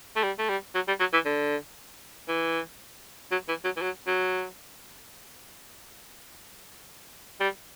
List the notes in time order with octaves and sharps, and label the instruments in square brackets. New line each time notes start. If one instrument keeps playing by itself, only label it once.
[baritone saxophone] A3
G3
A3
G3
F#3
G3
F#3
E3
D3
E3
F#3
E3
F#3
E3
F#3
F#3
G3